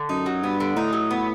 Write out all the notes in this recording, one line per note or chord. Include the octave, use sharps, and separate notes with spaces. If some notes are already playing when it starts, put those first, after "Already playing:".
Already playing: D3
F#2 D#4
F#3
G2 B3
D3
A2 D#4
F#3
B3